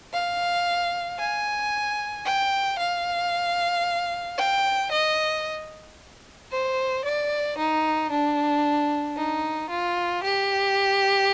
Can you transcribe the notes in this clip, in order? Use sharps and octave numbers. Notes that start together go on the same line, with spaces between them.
F5
G#5
G5
F5
G5
D#5
C5
D5
D#4
D4
D#4
F4
G4